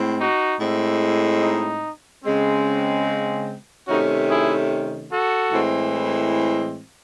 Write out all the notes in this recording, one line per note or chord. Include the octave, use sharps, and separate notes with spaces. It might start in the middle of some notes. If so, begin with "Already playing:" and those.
Already playing: A2 G#3 C4
D#4 F#4
A2 G#3 C4
D#4
C#3 G#3 C4
C3 D#3 A3 C#4 D#4 F#4
E4 G#4
F#4 A4
A2 E3 G#3 C4